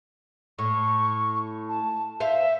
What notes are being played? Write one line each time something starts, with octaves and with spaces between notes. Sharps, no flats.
A2 C#6
A5
C5 E5 F5